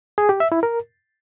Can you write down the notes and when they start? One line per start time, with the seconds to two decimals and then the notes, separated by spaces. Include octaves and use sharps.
0.18 G#4
0.29 G4
0.40 E5
0.52 E4
0.63 A#4